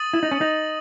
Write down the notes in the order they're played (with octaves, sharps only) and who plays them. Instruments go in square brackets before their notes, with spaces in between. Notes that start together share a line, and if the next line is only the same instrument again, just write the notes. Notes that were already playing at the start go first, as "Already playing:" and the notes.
Already playing: [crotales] D#6 A6 D#7 F#7
[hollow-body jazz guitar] E4
D#4
C#4
D#4